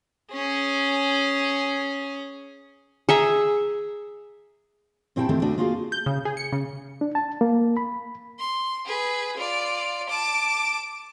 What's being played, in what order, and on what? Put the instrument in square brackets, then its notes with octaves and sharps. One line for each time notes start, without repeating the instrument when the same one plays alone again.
[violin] C#4 G#4
[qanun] G#4 E5 A#5
[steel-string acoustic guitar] A#2 C4 E4 G4 G5 A5
D3 D#3 A3 C4 G4 A4
D2 A3 D4 F#4 D5 D#5
A#3 F4 F#4 G#4 F5
[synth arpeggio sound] G6
C#3
G#4
C#7
C#3
[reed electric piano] D4
A5
A#3
B5
[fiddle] C6
G#4 B4
F4 D5
A5 D6